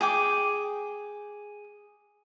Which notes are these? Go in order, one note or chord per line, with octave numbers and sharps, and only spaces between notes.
G#4 G5 D6